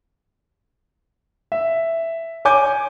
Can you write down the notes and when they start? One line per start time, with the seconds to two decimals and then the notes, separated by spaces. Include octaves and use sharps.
1.52 E5
2.45 C#5 G#5 D6 G6